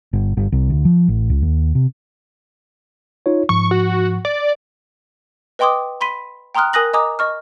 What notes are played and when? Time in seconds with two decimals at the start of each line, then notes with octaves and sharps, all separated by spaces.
0.13 G1
0.37 G1
0.52 C2
0.70 D2
0.85 F3
1.08 A1
1.30 C#2
1.42 D#2
1.75 C3
3.26 D#4 F4 C#5
3.49 G#2 F3 C#6
3.71 F#4
4.25 D5
5.59 B4 D#5 G5 C6 D6 D#6
6.01 B5 C6 B6 D#7
6.55 G5 A#5 C6 D#6 F6 F#6
6.73 A#4 G#5 D#6 F#6 A#6 F#7
6.93 D#5 G#5 A#5 D6 D#6
7.19 D#5 C#6 F6